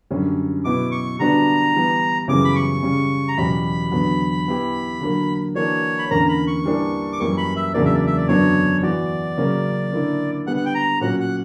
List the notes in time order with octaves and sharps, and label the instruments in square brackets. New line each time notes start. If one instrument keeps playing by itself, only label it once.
[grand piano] F#2 D3 G3 C#4
[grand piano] B2 F#3 B3 E4 [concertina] D6
[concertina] C#6
[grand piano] D3 G3 B3 D4 F#4 [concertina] A#5
[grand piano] E3 G3 B3
[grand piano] F#2 C#3 E3 G3 B3 [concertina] D6
[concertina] B5
C#6
[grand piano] C#3 G3 C#4
[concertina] A#5
[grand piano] E2 B2 F#3 C#4 G4 [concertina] B5
[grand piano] E2 D3 F#3 B3
E3 B3 E4 G4
D3 F#3 A#3
[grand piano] E3 A#3 D4 F#4 [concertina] C#5
[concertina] B5
[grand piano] E2 D3 A#3 C#4 [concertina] A#5
[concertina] B5
C#6
[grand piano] E3 G3 A#3 D4
[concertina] D6
[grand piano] F#2 E3 G3 A#3 [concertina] C#6
[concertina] B5
E5
[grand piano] E2 C#3 F#3 A#3 D4 [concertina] D5
[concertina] E5
D5
E5
D5
[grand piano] F#2 D3 F#3 B3 D4 [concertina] C#5
[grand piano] E3 B3 F#4 [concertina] D5
[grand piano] C#3 F#3 A#3 C#4
D3 A#3 E4
[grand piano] D3 G3 B3 [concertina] F#5
[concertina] F#5
G5
A#5
[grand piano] A#2 F#3 C#4 F#4 [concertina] F#5
[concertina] F#5